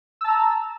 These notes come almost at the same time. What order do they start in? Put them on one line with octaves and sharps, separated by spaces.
E6 A5 A#5